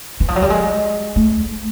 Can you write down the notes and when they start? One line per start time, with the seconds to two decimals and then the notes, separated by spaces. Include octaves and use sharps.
0.20 E3
0.28 F3
0.36 F#3
0.42 G3
0.50 G#3
1.16 A3